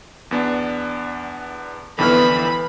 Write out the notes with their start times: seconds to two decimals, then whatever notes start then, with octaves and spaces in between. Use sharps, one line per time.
0.31 E2 B3 D4
1.98 F2 D3 E3 B3 B5 F6